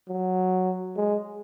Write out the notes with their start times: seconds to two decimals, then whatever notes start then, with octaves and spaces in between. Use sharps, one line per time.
0.08 F#3
0.96 G#3